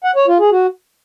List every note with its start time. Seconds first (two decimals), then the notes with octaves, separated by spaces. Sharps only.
0.04 F#5
0.16 C#5
0.28 F4
0.40 G#4
0.52 F#4